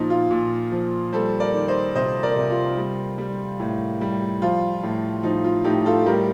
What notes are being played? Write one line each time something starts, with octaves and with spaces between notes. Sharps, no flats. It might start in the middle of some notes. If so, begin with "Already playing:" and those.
Already playing: A#2 F3 D#4 F4
F4
A#2
F3
G3 A4 C5
A#4 D5
D#3
C5 D#5
C3 C5 D#5
A#4 D5
C3
F4
G3
G3
A2
G3
F3 F4
A2
F3 D#4
F4
A2 D#4 G4
F4 A4
G3 G4 A#4